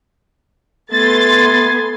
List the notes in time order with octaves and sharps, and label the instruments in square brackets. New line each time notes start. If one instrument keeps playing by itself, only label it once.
[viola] A3 B3 [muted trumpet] G#5 [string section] C6 A6